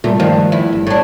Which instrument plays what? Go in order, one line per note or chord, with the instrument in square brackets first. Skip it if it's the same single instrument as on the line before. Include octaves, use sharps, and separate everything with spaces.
[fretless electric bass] A#2 F#3 G3 [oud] A3
[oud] G2 [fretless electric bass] D#3 F3
[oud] E2 E4
[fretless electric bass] G1
[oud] A2 D4